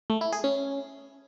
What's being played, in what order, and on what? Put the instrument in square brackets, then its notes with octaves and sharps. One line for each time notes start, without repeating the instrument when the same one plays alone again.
[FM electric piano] A3
E4
G#4
C#4